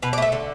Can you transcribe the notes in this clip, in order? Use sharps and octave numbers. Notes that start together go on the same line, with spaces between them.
B2 B4
D5
A3 E5
D3